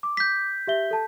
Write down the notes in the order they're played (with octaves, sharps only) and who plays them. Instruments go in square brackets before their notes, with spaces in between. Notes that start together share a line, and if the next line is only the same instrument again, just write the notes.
[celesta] D6
[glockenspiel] G6 B6
[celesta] G4 E5 G7
A4 A5